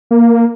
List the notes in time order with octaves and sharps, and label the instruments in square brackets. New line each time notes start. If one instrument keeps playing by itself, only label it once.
[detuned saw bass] A#3